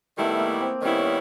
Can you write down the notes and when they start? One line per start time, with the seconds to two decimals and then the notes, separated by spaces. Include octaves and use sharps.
0.18 D#3 G3 A3 B3 E4
0.40 A#3
0.61 C4
0.82 D#3 G3 B3 C#4 E4
0.98 C#4